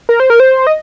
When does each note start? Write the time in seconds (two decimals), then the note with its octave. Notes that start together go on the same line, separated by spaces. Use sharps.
0.09 A#4
0.20 C5
0.30 A#4
0.40 C5
0.67 D#5